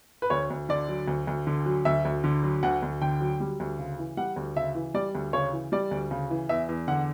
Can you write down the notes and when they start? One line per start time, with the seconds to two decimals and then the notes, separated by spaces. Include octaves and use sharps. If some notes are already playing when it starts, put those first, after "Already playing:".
0.22 B4
0.30 D2 C#5
0.50 D2
0.69 D3 D5
0.88 F#3
1.08 D2
1.27 D2
1.47 D3
1.66 F#3
1.85 D2 E5
2.05 D2
2.24 D3
2.43 F#3
2.63 D2 F#5
2.83 D2
3.01 D3 G5
3.21 F#3
3.40 G3
3.60 D2
3.79 C#3
3.99 E3
4.17 G3 F#5
4.36 D2
4.56 C#3 E5
4.75 E3
4.94 G3 D5
5.15 D2
5.33 C#3 C#5
5.53 E3
5.72 G3 D5
5.91 D2
6.11 C#3
6.30 E3
6.49 E2 E5
6.69 E2
6.88 D3 F#5